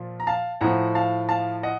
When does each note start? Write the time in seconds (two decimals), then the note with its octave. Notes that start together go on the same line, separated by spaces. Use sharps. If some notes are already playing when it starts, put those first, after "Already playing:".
Already playing: A#2 F3
0.20 A#5
0.27 F5 A5
0.61 A2 F3 F#5 A#5
0.95 F5 A5
1.29 F5 A5
1.63 D#5 F#5